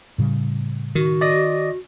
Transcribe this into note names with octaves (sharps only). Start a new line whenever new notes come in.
A2 C#3 G3
D#3 F#4
D5 D#5 A#6